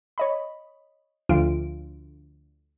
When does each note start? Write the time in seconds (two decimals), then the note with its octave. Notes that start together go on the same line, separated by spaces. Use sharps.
0.18 C#5 D#5 B5
1.29 D2 F3 F4 D7